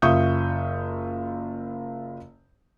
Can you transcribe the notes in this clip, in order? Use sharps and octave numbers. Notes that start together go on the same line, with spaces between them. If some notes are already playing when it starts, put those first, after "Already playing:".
F#1 F4 E5 C#6 D#6 G6